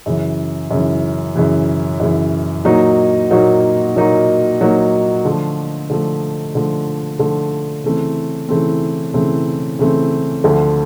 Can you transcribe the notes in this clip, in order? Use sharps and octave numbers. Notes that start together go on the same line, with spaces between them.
F#2 C#3 E3
F#2 C#3 E3
F#2 C#3 E3
F#2 C#3 E3
A#2 F#3 A#3 D#4 F#4
A#2 F#3 A#3 D#4 F#4
A#2 F#3 A#3 D#4 F#4
A#2 F#3 A#3 D#4 F#4
D3 F3 A3
D3 F3 A3
D3 F3 A3
D3 F3 A3
C#3 E3 A3 C4
C#3 E3 A3 C4
C#3 E3 A3 C4
C#3 E3 A3 C4
D2 D3 F3 A3